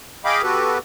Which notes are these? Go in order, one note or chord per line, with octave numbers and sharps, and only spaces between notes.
G#4 D#5 F5 G5 B5 D6
B3 F#4 G4 A4 B4